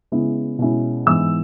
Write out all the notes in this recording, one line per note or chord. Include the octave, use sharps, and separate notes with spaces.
C#3 G#3 B3 E4
B2 G#3 C#4 E4
G#2 E3 B3 E4 E6